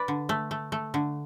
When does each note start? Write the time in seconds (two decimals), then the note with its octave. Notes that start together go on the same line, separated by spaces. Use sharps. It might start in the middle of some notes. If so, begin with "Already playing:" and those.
Already playing: B4 D5
0.08 D3
0.29 A3
0.51 A3
0.72 A3
0.94 D3